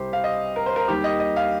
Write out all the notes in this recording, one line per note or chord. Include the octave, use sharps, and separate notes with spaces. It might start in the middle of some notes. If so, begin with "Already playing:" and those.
Already playing: C2 C3 G3 G4 C5
F5
D#5
A#4
C5
A#4
D#2 D#3 G3 G4
D#5
D#5
F5